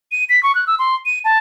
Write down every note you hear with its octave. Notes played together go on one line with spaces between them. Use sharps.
D#7
B6
C#6
F#6
E6
C6
D#7
A5